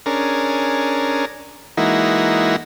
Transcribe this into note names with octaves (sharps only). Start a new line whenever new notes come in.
C#4 D4 G#4 A#4
E3 G#3 A#3 D#4 E4 F#4